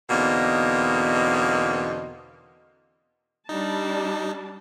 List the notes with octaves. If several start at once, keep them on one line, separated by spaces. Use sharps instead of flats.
E2 B2 D3 A#3 C4 D#4
G3 D4 D#4 A5